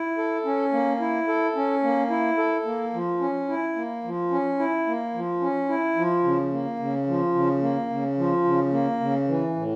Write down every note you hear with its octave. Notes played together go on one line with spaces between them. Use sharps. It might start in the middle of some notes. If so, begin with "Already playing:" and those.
Already playing: E4
A4
C#4
A#3
E4
A4
C#4
A#3
E4
A4
A#3
F3
C#4
E4
A#3
F3
C#4
E4
A#3
F3
C#4
E4
F3
C#3
A#3
C#3
F3
C#3
A#3
C#3
F3
C#3
A#3
C#3
E3
A2